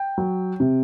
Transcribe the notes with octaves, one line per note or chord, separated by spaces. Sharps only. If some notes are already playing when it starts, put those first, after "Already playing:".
Already playing: G5
F#3
C3